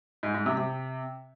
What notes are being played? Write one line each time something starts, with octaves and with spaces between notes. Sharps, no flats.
G#2
G#2
C3
C3